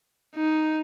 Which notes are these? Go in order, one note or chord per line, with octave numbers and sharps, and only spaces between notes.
D#4